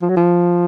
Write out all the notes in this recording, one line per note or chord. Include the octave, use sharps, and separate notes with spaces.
F3
F#3
F3